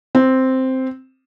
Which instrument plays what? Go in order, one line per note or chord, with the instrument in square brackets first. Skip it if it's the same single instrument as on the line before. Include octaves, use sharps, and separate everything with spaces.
[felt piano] C4